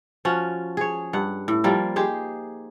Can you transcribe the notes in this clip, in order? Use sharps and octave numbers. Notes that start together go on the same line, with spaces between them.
F3 C#4 F#4
G#4 C#5
G2 F#5
A2
F3 G3 A#3
D#4 G4 G#4 C5